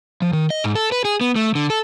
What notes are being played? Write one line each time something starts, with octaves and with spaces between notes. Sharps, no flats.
F3
D#3
D#5
G#2
A4
B4
G#4
B3
A3
D3
A4